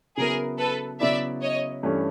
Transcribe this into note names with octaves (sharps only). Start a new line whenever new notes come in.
C#3 F#3 B3 E4 G#4 A#4
A4 B4
C#3 F#3 B3 E4 D5 E5
C#5 D#5
G2 E3 A3 C#4